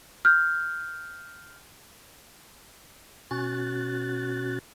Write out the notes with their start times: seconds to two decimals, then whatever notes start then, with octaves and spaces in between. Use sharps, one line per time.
0.25 F6 G6
3.31 B2 C#4 F#4 F#6 A6